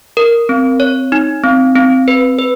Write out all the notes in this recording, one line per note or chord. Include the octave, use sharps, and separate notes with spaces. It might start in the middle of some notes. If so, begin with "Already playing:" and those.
A#4
C4
C#5
D#4
C4
C4
B4
B4